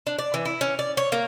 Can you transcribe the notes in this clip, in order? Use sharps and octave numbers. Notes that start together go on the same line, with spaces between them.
D4
D5
E3
E4
C#4
D5
C#5
A#3